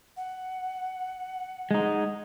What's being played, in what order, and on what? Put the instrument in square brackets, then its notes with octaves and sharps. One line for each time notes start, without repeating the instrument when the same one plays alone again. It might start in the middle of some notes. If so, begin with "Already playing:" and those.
[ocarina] F#5
[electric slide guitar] G#3 D#4